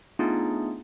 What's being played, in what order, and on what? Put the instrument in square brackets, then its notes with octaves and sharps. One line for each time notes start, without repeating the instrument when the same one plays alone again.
[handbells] A3 B3 D4 D#4 F4 G#4